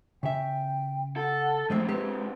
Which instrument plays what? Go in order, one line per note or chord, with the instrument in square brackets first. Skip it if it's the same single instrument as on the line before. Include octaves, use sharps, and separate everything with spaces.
[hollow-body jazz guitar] C#3 E5 [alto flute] G5
[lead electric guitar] A4 [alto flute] F#5
[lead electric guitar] E2 C3 [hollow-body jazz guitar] F3 G#3 C4 [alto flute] A3
[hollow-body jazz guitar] G#3 C4 G4 [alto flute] B4